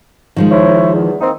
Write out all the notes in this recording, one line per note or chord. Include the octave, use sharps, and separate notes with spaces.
D#3 F3 G#3
E4 C5 C#5
E2
A#3 C4 D#4